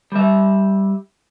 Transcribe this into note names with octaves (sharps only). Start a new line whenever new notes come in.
G3 E5